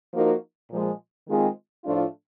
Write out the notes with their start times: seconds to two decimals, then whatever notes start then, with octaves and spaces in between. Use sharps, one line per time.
0.14 F3 A#3 D#4 F#4 A#4
0.71 A#2 F3 G#3
1.28 D#3 G#3 C4 F4 G#4
1.84 A2 F3 A3 D4 F4